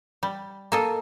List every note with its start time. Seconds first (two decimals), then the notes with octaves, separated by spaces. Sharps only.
0.23 G3
0.72 A#3 A4 D#5